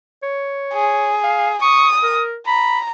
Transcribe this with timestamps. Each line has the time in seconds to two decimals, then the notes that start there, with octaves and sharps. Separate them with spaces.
0.23 C#5
0.73 G#4
1.24 F5
1.62 C#6 D#6
2.03 A#4
2.47 A#5 B5